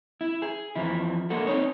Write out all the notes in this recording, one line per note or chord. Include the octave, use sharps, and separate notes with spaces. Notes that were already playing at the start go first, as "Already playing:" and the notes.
E4
G#4
F2 E3 F3 E4
G#3 A#3 D4 F#4 A4
C4 D#4 C#5